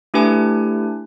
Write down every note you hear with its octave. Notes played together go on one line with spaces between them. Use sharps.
A3 D4 E4 G4 B4 G#5